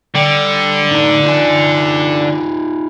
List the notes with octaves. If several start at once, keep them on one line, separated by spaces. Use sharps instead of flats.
D3 G3 G5
A2 D4 D#4
D#4 F4 G#5